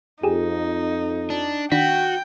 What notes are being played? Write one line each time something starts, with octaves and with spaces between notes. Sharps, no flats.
F2 D#4 G4 G#4
D4
D#3 D4 F#4 G5 B6